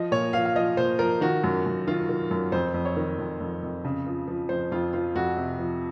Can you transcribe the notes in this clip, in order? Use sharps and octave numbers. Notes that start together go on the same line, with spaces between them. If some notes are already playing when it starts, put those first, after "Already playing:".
Already playing: F3 D#5
A#2 C#5
F3 F5
F5
F3 D#5
A#2 C5
F3 A#4
D#3 F#4
F#2
F#2
D#3 F4
D#3
F#2
F2 C5
F2
C#5
D#3
F2
F2
F2
C#3
F3
F3
F2 C5
F2 F4
F3 F4
F2 F#4
C3
F3